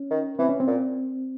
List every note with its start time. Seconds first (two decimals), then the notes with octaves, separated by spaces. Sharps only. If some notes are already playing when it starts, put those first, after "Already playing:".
Already playing: C#4
0.11 D#3
0.39 E3 C4
0.49 C#4
0.60 C4
0.67 A#2